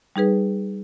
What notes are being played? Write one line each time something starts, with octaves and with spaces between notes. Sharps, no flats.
G3 D#4 G#4 B4